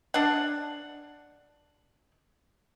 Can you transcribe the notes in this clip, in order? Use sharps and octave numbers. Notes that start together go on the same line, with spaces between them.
D4 F#5